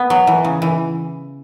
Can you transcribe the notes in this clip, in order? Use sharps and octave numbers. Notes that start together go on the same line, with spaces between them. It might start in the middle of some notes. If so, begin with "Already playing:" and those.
Already playing: B3
F#3
E3
C#3
E3